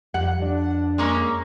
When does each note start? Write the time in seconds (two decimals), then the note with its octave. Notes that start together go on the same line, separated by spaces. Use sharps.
0.14 F2 G3 F#5
0.42 D4
0.98 G#3 A#3 C#4